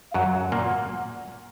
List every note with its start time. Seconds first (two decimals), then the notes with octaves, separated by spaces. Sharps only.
0.11 F5
0.14 F#2 F#3 F#5
0.52 A#2 A#3